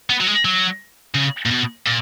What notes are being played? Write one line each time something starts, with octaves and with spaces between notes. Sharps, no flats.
B3
F#3
G#3
F#3
C#3
A#2
B2
A#2